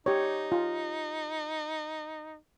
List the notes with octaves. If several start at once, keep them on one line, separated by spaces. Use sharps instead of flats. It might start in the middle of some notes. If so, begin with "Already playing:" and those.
D#4 G4 C#5
F4